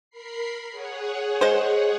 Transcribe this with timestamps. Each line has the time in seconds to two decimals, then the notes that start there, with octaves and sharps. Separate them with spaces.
0.10 A#4 B5 C7
0.70 G#4 C#5 F#5
1.41 G#3 C5